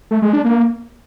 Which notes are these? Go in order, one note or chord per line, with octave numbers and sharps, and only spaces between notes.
A3
G#3
D4
A#3